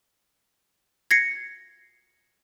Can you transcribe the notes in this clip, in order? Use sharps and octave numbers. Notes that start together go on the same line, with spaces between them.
G#6 A#6 C7 C#7